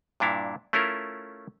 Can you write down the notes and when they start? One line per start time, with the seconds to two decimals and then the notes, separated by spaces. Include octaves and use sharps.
0.20 G2 A#2 D4 E4 F5
0.73 A3 C#4 E4 F4 A#4